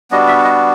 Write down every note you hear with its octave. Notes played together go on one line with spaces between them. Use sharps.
G3 B3 D4 F#4 D#5
E5
D#5